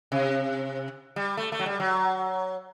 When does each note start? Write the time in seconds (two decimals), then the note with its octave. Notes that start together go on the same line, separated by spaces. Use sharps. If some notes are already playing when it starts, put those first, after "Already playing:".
0.12 C3
1.16 G3
1.37 A3
1.52 A3
1.59 F#3
1.66 G3
1.80 F#3